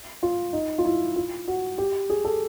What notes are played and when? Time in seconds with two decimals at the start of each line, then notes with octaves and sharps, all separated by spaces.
0.23 F4
0.53 D#4
0.78 F4
0.85 E4
1.16 F4
1.48 F#4
1.78 G4
2.10 G#4
2.25 A4